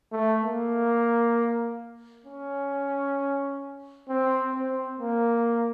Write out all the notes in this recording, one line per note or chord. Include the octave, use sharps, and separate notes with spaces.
A3
A#3
C#4
C4
C4
A#3